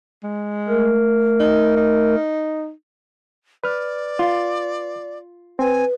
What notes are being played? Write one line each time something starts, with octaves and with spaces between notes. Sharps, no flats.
G#3
A3 A#4
D#4
D#4
B4 D5 F6
F4
C4 B4 G#5